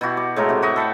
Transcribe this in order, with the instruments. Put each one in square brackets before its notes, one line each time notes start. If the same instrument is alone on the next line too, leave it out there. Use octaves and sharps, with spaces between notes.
[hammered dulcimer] B2 E4 F#4 G4
D6
A2 G#3 A3 A#4
C3 G4
F#4 B4 D#5 E5
A4 B4 E5 G5